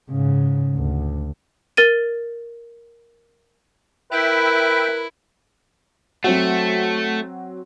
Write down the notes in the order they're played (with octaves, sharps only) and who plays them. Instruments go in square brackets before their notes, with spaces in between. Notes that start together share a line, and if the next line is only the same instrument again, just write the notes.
[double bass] G#2 C#3
D2
[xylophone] A#4 A6 D#7
[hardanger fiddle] E4 [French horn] A#4 [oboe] B4 [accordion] E5 G5
[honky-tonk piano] F#3 C4 F#4 [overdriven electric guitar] A3